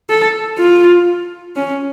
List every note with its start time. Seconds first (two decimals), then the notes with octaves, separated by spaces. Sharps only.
0.10 A4
0.59 F4
1.56 C#4